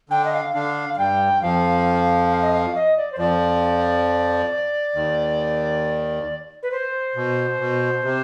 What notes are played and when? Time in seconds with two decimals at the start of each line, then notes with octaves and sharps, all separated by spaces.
0.10 D3 D4 G5
0.25 D#5
0.32 F5
0.54 D3 D4 F5
0.94 F5
0.98 G2 G3 G5
1.42 F2 F3 F5
2.30 F5
2.42 D#5
2.52 F5
2.75 D#5
2.97 D5
3.12 C5
3.18 F2 F3 D5
4.95 D#2 D#3
6.63 B4
6.72 C5
7.16 B2
7.59 B2
8.04 C3